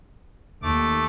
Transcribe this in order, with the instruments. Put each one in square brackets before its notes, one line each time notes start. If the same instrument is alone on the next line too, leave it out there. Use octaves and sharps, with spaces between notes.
[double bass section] D#2 [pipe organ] A3 D6